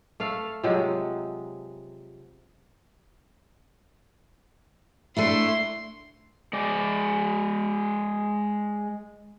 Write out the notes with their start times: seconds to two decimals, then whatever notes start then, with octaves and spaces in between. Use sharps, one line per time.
0.20 A3 A4 F5
0.63 C3 F3 F#3 G#3
5.17 A3 D4 E4 C6
6.53 G#3 D5